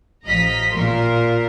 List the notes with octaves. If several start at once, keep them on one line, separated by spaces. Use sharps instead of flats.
A1 F3 D#5 A#5 B6
A#2 A#4 C6